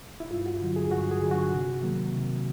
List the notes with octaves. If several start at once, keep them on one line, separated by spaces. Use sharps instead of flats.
E4
G2 F4
F#4
D3 F#3
G#4
G2 F#4
G#4
D3 F#3
F#4
C3
D#3 F#3 A#3
C3